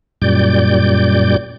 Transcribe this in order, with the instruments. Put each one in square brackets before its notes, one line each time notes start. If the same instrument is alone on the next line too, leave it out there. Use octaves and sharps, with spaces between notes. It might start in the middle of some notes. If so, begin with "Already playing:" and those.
[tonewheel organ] F#2 A#2 G3 D5 G6